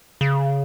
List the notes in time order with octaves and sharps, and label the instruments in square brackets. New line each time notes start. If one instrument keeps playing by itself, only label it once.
[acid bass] C#3